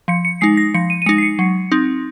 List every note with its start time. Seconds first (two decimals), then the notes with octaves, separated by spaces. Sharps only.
0.08 F3 C#7
0.25 C#7
0.41 G#3 D#4 C7
0.57 A#6
0.74 F3 C#7
0.90 D#7
1.02 D#7
1.06 G#3 D#4 C#7
1.18 C7
1.22 C#7
1.39 F#3
1.72 C4 D#4